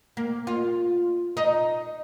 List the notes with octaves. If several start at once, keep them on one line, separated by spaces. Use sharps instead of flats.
A#3
F4
D#4